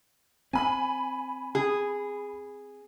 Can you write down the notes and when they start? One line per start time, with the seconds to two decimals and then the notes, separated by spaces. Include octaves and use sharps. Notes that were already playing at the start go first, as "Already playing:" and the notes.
0.53 C4 G#5 B5
1.55 G#4